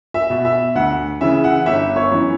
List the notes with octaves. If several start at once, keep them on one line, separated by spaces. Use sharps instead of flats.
E5
B2
E5
D2 F#5
C#3 E3 E5
F#5
G1 E5
C#5
F#2 E3